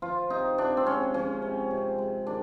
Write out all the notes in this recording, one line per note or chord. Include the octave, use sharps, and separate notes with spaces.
F3 F4
C3 D#4
C3 D4
C4
G#3 C#4
F3 C#4
C3
C3
G#3
D#3 D4